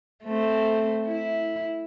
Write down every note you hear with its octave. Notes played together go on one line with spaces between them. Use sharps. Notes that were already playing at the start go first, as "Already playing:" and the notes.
A3 C4
E4